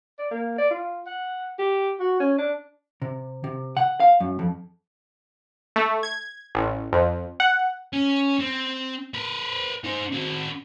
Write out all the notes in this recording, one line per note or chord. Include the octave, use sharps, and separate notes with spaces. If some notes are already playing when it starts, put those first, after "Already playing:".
D5
A#3
D5
F4
F#5
G4
F#4
C#4
D4
C3
C3
F#5
F5
F#2
F2
A3
G#6
A1
F2
F#5
C#4
C4
A#4 B4
D#4 C5
C4 F#4